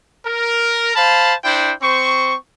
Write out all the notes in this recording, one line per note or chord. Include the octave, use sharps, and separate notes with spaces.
A#4
C5 F5 A5 B5
D4 E4 C5 G5
C4 C5 C#6